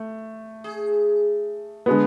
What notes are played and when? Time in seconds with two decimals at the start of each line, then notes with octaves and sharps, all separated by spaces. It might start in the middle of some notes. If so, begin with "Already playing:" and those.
Already playing: A3
0.64 G#4
1.86 D3 G#3 B3